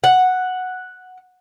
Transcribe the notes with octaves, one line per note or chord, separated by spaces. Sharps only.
F#5